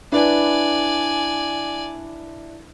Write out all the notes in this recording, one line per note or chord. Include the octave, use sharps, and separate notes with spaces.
D4 E4 B4 D5 G#5